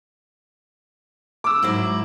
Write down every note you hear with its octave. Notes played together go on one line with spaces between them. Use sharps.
D6 E6
G#2 F#3 E4